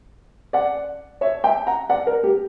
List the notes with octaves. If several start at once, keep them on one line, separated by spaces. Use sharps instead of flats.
D5 F#5
C#5 E5
E5 G5
F#5 A#5
D5 F#5
A#4
G4